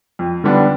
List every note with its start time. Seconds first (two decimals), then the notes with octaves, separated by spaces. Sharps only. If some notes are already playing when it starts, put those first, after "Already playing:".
0.19 F2
0.44 D3 G3 B3 D4